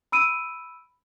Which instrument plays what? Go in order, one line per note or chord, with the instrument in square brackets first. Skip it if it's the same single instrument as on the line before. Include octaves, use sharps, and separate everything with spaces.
[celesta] B5 E6 D7 D#7